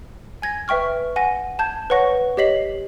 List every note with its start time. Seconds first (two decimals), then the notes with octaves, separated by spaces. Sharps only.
0.42 G#5 G#6 A#6
0.68 B4 E5 G5 C#6 F6
1.16 F#5 G#5 A#6
1.59 A5 G6 G#6
1.90 B4 C#5 F#5 C#6 A#6
2.37 G4 C#5 D#5 B6 C7 F#7